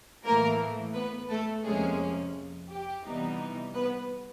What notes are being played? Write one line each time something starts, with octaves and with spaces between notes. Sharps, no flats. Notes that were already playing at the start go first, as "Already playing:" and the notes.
A2 E3 A3 A#3 A#4
B3 B4
A3 A4
F2 C3 F3 G#3 A#3 C#4 G#4
G4
C3 E3 G3 B3 D#4
B3 B4